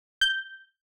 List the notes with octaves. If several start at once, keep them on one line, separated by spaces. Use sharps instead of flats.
G6